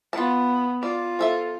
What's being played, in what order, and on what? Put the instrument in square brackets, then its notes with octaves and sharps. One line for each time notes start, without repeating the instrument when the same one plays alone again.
[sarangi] B3 [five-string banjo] F4 A5
[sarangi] F4 [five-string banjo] D5
[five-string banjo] F3 A4 E5